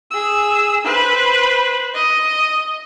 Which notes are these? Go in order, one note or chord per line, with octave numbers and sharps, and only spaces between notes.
G#4 E6
B4 C5
D#5